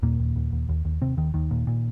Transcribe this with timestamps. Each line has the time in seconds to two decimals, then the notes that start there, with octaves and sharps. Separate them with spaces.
0.03 D#2 A#2 A#3
0.19 D#2
0.36 D#2
0.52 D#2
0.69 D#2
0.85 D#2
1.02 D#2 C3 C4
1.17 D#2 D#3
1.34 D#2 D#3
1.51 A#2
1.67 A#2